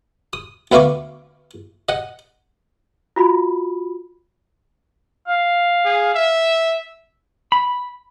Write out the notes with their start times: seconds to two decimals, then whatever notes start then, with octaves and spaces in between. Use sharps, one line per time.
0.33 D#6
0.72 D2 B3 E5 F5 C#6 D6
1.89 D#5 F#5
3.16 F4 F#4 B5
5.28 F5
5.85 G#4
6.15 E5
7.52 B5